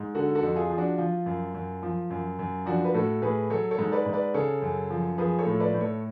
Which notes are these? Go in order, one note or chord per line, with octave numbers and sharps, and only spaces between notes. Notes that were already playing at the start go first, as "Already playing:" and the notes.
Already playing: G#2
D3 F#4 A4
F#4 A4
F2
F4 G#4
F3
D4 F#4
F3 F4
F#2
F#2
F3
F#2
F#2
F3 D4 F#4
B4
A2 F#4 A4
A2 G#4 B4
F#3 A4 C#5
A4 C#5
G#2
B4 D5
G#2
B4 D5
C#3 A4 C#5
F#2
F3
F3 G#4 B4
A4 C#5
A2
B4 D5
A2
A4 C#5